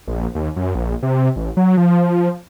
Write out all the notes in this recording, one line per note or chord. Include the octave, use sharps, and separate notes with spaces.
A#1
D#2
F#2
A#1
C3
A1
F#3
F3